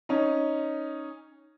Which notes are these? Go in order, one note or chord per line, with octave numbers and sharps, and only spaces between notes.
C#4 D#4